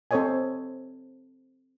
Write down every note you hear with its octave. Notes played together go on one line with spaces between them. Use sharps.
C4 A4 C5 C#5 D#5 G#5